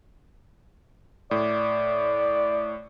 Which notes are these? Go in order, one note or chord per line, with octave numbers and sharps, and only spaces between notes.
A2 D5